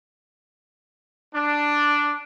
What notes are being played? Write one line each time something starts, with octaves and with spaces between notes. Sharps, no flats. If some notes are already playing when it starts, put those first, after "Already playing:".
D4